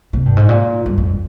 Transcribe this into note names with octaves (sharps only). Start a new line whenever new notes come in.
C3
G2
G#2
A#2
G2
F2